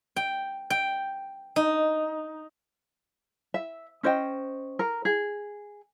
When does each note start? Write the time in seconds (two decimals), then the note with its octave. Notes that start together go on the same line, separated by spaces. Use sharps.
0.16 G5
0.70 G5
1.56 D#4
3.54 E5
4.03 C#4 C5 D#5 G5
4.79 A#4
5.05 G#4